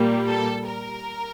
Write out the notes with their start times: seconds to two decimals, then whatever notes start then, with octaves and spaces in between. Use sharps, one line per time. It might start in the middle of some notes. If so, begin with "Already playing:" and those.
Already playing: A#2 G3 A#3
0.26 A4
0.66 A#4